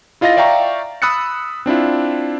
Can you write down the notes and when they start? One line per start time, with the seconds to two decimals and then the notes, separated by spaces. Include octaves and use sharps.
0.21 E4 F4 D#5 F5 A6 A#6
0.37 D5 E5 F5 G5 A#5 C#6
1.02 B5 D#6 E6 F#6 A6 C#7
1.66 C4 D4 E4 F4